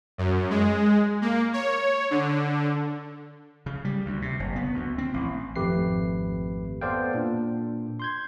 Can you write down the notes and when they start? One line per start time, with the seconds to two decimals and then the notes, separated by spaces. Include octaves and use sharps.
0.18 F#2
0.50 G#3
1.22 A#3
1.53 C#5
2.11 D3
3.66 C#3
3.85 G3
4.06 D2
4.22 C3
4.40 F#1
4.56 B3
4.74 D2
4.98 C4
5.14 A1
5.56 G#1 F2 A3 G4 B4 C7
6.81 B3 A4 C5 D5 F5 G5
7.14 A#2 D4
8.00 C6 G6 G#6